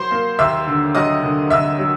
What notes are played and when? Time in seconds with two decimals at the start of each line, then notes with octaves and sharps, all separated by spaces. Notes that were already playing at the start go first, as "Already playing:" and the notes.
Already playing: F#3 C5 C6
0.11 A#3
0.39 D#2 E5 E6
0.67 D3
0.95 F#3 D#5 D#6
1.23 D3
1.50 D3 E5 E6
1.79 F#3